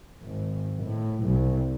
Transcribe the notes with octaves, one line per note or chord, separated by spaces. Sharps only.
G#1
A2
C2